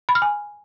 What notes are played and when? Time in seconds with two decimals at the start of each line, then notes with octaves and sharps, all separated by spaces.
0.09 B5
0.15 F6
0.22 G#5